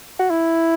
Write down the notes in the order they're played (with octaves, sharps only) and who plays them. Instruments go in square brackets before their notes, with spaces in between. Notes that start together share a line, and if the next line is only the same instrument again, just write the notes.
[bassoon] F#4
E4